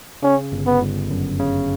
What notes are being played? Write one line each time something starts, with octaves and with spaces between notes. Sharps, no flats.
C#3 C#4
G1
B3
G1
F#2
C#3